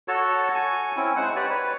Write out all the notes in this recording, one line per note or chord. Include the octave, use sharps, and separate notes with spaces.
F#4 A4 C#5 A5
G#5 C#6
C4 C#4 E4
G#3 D#4 C5 F#5
G4 B4 C#5 D5
B4 C#5